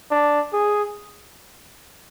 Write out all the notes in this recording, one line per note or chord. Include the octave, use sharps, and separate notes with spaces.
D4
G#4